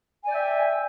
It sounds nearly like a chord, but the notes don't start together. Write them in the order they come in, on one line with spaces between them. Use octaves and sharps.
G#5 D5 G5 E5